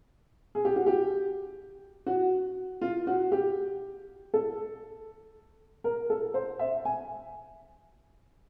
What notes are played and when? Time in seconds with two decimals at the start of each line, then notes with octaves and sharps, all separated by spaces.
0.55 G#4
0.65 G4
0.76 F#4
0.86 G4
2.06 F#4
2.81 F4
3.07 F#4
3.32 G4
4.34 A4
5.84 A#4
6.10 A4
6.34 C5
6.59 E5
6.85 G#5